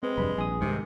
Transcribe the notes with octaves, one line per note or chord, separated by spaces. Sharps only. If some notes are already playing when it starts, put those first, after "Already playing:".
G#3 C4 B4
F1 G2 G3 B4 B5
A#1 G#4 D#6
C2 G#2 C3 D#3